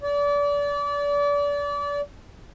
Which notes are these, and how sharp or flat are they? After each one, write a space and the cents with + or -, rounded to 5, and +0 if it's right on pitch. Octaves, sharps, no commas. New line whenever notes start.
D5 -30